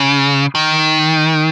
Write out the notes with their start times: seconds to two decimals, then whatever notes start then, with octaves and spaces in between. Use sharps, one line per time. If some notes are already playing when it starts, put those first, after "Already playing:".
Already playing: C#3
0.55 D#3